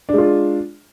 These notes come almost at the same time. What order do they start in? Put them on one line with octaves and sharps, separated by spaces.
D4 G#3 F4